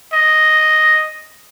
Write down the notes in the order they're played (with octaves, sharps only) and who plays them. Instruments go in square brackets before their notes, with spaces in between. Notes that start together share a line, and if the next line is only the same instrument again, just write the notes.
[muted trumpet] D#5